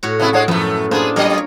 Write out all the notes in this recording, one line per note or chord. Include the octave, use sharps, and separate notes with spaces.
A2 F#4 C#5
C3 B3 E4
G#3 D4 F#4 C#5 F#5
F#2 A2 F3 A3 B3
A#3 B3 D4 F4 G#4 C5 A#5
F#3 A#4 C#5 D#5